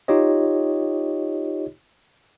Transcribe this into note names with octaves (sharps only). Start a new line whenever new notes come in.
D#4 F4 G4 C#5 D#5